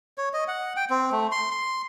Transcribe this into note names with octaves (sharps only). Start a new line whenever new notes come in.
C#5
D#5
F#5
G5
C4
A3
C6
C6